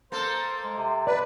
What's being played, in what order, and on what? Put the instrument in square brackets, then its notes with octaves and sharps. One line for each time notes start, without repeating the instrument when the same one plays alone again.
[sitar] A#3 A4 [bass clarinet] C5
[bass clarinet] G#3
C3
[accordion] B4 [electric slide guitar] D5